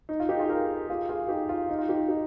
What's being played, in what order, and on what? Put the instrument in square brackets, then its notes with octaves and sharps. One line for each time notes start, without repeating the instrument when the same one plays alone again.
[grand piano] D#4
F4
D#4 G4
F4 G#4
G4 A#4
F4 G#4
F4 G#4
D#4 G4
F4
D#4
F4
D#4 G4
D#4 G4